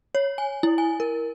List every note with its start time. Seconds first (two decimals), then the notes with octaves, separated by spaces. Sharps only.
0.15 C#5
0.38 G#5
0.63 E4
0.78 G#5
1.00 A#4